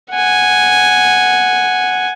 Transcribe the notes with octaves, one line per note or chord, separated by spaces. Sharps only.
F#5 G#5